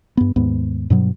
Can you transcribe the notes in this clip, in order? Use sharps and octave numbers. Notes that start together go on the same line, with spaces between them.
G2 B3
D#2 G#2 B3
G2 B2 F#3